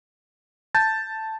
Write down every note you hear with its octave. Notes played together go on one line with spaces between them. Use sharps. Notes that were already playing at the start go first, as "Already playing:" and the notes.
A5 G6 A6